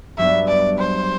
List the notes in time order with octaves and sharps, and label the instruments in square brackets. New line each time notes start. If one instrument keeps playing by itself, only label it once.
[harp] G2 F#3 B3 D4 [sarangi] E5
[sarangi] D5
C5